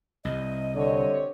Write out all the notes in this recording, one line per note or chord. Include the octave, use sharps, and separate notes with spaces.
C2 D#5
D3 C4 G4 C#5